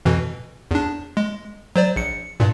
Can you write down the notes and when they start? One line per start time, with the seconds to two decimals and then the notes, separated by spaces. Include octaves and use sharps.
0.05 F2 B2 E3
0.71 E2 D4
1.17 G#3
1.76 F#3 C5 D5
1.96 A#1 C#7
2.40 G2 A#2